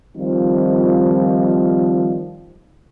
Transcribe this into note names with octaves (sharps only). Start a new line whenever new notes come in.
D#3 F3 G3 C4 D#4 F4